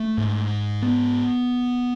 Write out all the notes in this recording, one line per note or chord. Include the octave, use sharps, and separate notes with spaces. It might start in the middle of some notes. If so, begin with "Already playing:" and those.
Already playing: A3
G#2
B3